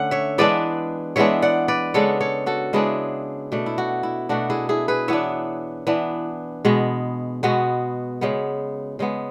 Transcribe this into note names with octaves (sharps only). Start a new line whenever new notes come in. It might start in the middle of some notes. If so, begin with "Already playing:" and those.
Already playing: D3 A3 C#4 F#5
C#5 E5
E3 G#3 B3 D4 B4 D5
E3 G#3 B3 D4 C#5 E5
D5 F#5
B4 D5
C#3 G#3 B3 D4 A4 C#5
A4 C#5
F#4 A4
C#3 G#3 B3 D4 E4 G#4
B2 A3 D4
E4
F#4
E4
B2 A3 D4 F#4
E4 G#4
E4 G#4
G#4 B4
E3 B3 D4 C#5 E5
E3 B3 D4
B2 G#3 B3
B2 G#3 B3 F#4
C#3 G#3 B3
C#3 G#3 B3